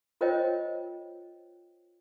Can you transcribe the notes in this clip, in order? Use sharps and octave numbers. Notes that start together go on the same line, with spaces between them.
F4 A#4 C5 C#5 D#5 G5